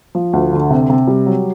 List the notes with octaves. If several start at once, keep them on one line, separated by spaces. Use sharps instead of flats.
F3
D2
D3
C3
C3
G3
F#3